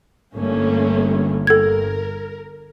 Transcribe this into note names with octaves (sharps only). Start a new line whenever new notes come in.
G1 A3 A#3 C#4
A4 A#4 G#6